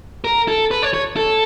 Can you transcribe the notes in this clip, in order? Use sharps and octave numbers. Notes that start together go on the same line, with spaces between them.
A#4
A4
B4
C#5
C#5
A4